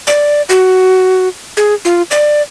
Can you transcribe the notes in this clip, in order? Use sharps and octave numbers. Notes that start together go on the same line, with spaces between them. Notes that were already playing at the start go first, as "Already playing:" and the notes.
D5
F#4
G#4
F4
D5